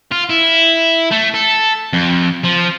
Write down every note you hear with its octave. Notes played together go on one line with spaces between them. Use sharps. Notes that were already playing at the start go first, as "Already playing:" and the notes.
F4
E4
A3
A4
F2
F3